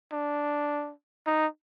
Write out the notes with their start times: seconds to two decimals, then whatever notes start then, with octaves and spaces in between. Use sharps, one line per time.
0.12 D4
1.27 D#4